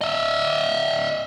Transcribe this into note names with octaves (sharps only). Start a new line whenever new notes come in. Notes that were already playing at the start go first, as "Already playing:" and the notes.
D#5 E5